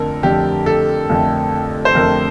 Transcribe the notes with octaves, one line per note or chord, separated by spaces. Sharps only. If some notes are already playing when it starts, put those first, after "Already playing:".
Already playing: F2 D3 A3 C4 A4 A#4
F2 D3 A3 C4 G4
A4
F2 D3 A3 C4
C5
F2 D3 A3 C4 A#4